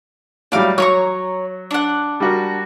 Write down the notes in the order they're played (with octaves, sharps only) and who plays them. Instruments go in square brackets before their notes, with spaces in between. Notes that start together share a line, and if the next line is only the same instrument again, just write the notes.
[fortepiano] A2 F#3 G3 [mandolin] D5 F5
[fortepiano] F#3 [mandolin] C#5 A#5 C#6
[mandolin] D4 F#5
[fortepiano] G3 F#4 A#4